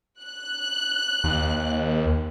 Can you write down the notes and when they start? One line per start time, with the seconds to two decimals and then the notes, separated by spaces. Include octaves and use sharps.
0.22 F#6
1.24 D#2